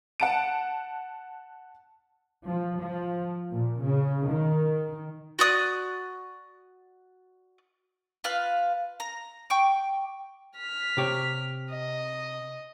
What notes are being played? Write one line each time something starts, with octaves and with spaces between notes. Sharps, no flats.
F#5 A5 D7
F3
F3
A#2
C#3
D#3
F#4 D5 D#6 F#6
F4 B4 F5 F#6
A#5
G5 C#6 D6
F6 B6
C3 G4 C#5
D#5